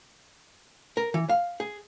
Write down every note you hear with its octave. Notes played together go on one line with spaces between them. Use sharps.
A#4
E3
F5
G#4